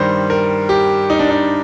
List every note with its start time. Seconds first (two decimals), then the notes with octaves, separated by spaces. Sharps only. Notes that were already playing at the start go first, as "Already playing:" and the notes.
Already playing: G2 D#3 G3 C5
0.30 A#4
0.69 G4
1.10 D#4
1.19 D4
1.29 D#4